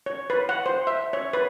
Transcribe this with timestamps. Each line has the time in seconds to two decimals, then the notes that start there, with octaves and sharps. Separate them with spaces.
0.06 C#5
0.30 B4
0.49 F#5
0.66 C5
0.87 E5
1.13 C#5
1.33 B4